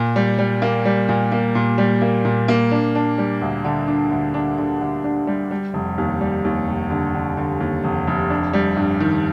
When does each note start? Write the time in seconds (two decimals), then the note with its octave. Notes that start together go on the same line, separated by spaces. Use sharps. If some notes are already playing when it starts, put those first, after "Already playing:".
Already playing: A#2
0.16 G3
0.39 G3
0.62 A#3
0.85 G3
1.09 A#2
1.32 A#3
1.55 A#2
1.78 G3
2.02 A#3
2.25 A#2
2.48 A#3
2.71 D4
2.95 D4
3.18 G3
3.42 D2
3.65 D3
3.88 D4
4.11 D2
4.34 D4
4.58 D3
4.81 D3
5.04 D4
5.27 G3
5.51 G3
5.74 F1
5.98 D#2
6.21 G3
6.45 D#2
6.68 F1
6.90 D3
7.15 D3
7.37 D3
7.60 D#2
7.84 F1
8.07 F1
8.30 D4
8.53 G3
8.77 G2
9.00 D#3